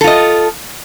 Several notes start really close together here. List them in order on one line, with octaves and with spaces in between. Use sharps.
A4 F4 D#5